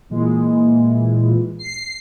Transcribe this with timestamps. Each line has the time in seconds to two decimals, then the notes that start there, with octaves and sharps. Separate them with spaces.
0.10 A#2 E3 G#3
1.59 C7